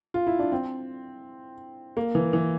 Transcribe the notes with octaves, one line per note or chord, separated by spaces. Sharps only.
F4
E4
D4
C4
A#3
E3
E3